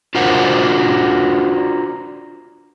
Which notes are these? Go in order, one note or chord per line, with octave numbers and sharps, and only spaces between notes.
D4 F4 F#4 A#4 C5 F#5